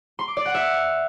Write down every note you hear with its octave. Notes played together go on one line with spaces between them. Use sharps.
C6
D6
D5
F#5
E5